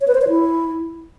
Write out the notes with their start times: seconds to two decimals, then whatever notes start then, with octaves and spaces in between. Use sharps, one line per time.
0.01 C#5
0.08 B4
0.15 C5
0.22 C#5
0.29 E4